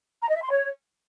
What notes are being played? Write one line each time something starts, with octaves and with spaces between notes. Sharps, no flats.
A#5
D#5
E5
C6
C#5